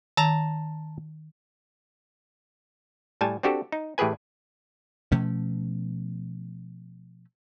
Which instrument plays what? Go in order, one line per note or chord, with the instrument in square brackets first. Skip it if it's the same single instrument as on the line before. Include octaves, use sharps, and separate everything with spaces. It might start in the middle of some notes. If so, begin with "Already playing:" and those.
[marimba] D#3 [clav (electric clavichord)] A5 A#5
[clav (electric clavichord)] A2 G3 G#5 A5
C4 D4 F#4 G4 A4
D#4
A2 E3 G4 G#4 B4 G#5
[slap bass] B2 F3 A3 C#4